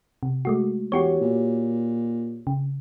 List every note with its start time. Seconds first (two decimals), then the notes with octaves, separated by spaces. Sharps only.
0.23 C3
0.45 G#3 A3 F#4
0.92 E2 F#4 G4 C#5
1.21 A#2
2.47 C#3